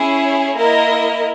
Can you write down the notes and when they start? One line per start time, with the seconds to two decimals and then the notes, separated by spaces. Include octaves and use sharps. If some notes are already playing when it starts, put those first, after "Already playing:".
Already playing: C#4 E4 G#4 C#5
0.55 A#3 E4 A#4 D#5